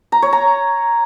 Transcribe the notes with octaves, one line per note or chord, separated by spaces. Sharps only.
A#5
C#5
A#5